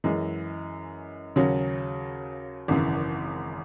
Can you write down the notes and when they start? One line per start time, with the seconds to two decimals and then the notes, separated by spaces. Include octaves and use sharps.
0.04 F#2 E3 G#3
1.36 D#2 C#3 F#3 C#4
2.68 G#1 F#2 C#3 E3